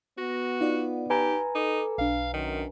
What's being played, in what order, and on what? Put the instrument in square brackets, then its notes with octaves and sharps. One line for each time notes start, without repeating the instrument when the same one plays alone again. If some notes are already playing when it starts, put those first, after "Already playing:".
[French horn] B3 [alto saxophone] F#4 [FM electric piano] A#6
[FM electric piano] D#4 D5 F#5 [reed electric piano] F4
[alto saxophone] G4 [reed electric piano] B4 G#5 A#5
[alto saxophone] D#4 [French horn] A4 [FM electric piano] D6
[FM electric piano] B1 D4 [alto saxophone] F5
[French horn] F#2 [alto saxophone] D#3